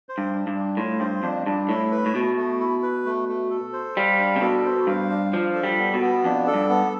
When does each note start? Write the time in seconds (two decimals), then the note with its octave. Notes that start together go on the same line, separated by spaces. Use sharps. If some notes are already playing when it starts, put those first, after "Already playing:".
0.09 C5
0.18 G2
0.33 D4
0.47 G2
0.54 D4
0.77 A2 F4
1.00 G2 C5
1.23 F2 D4
1.46 G2 D4
1.69 A2 E4
1.92 B4
2.06 A2
2.15 B2 A3
2.37 A3
2.60 E4
2.83 B4
3.06 A3
3.29 A3
3.50 A4
3.73 C5
3.97 G3 F5
4.19 D4
4.36 C3
4.41 B2 A4
4.65 C5
4.87 G2 F5
5.10 D4
5.32 F3 D4
5.55 A4
5.63 G3
5.79 B3
5.94 B2
6.01 B3
6.24 F2 D4
6.47 A4
6.54 G2
6.69 B3